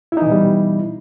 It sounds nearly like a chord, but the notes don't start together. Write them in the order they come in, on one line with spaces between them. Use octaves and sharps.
E4 D#4 E3 B2 G3